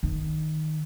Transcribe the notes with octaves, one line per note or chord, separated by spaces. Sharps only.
D#3